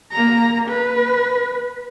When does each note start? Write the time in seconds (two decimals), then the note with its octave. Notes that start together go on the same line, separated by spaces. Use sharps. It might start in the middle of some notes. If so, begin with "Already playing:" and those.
0.12 A#3 A#5
0.68 B4